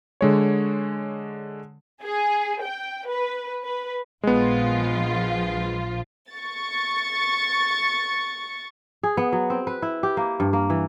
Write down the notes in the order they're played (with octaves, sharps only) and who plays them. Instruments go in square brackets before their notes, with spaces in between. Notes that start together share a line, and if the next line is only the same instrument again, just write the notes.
[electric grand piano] D3 G#3 C#5
[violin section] G#4
G5
B4
B4
[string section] A#1 F3 F4 [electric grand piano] G#3 B3
[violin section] C#6 A6
[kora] G#4
B3
F#3
C4
B4
E4
G4
A#3
G2
A#3
E3